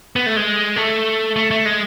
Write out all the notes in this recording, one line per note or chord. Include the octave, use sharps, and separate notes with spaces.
B3
A3
G#3
A3
A3
A3
G#3